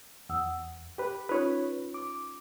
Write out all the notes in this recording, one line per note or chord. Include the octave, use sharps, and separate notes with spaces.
E2 F#5 D#6 E6
G4 B4
C#4 D#4 F4 B4 C#5
D6